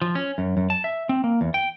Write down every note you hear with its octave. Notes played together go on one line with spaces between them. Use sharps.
F3
C#4
F#2
F#2
A5
E5
C4
A#3
E2
G5